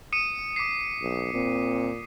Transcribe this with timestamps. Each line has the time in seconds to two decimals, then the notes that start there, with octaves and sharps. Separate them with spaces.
0.13 D#6 C#7 D#7
0.56 D6 B6 C7
1.02 B1
1.34 A#2 C4